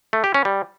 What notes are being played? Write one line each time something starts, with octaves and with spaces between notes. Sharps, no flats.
A3
G4
C#4
G3